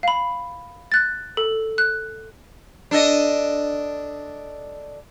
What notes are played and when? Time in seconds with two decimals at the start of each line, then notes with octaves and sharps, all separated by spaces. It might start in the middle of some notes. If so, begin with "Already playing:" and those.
0.03 F5 B5
0.92 F#6 A6
1.37 A4
1.78 F#6
2.91 D4 A4 D#5